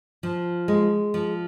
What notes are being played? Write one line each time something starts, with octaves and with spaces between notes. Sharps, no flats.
F3
G#3
F3